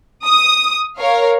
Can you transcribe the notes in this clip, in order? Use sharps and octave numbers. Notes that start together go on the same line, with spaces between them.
D#6
A#4 C#5 F5